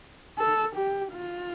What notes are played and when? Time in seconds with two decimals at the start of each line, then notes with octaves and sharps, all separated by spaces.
0.38 A4
0.76 G4
1.13 F4